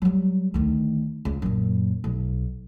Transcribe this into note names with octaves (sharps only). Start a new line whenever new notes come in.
F#3 G3
D2 D#3
C#2
F#2 A#2
B1